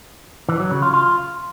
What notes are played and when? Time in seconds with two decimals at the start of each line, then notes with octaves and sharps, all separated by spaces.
0.49 E3
0.60 F#3
0.71 C#3
0.82 F4
0.93 F4